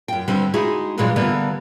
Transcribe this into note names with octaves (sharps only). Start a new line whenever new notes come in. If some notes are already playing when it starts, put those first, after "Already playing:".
F#2 G5
G2 D3 G3 C4
G#3 D#4 E4 F#4 G#4
G2 A#2 E3 F#3 G#3
D3 E3 G3 A#3 B3